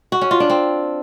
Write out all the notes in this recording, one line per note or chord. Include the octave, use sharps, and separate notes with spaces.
F#4
C#4
F4
D4
C4